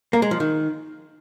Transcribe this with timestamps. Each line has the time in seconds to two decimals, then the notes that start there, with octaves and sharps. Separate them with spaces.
0.13 A#3
0.22 G#3
0.31 F3
0.40 D#3